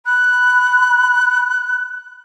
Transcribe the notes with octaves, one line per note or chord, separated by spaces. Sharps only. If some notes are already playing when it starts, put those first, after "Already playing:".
B5 F#6